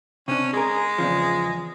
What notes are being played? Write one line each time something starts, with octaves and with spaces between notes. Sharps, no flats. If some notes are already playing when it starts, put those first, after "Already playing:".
C3 C#4 D4
G#3 G#4 A#4
E2 C#3 F3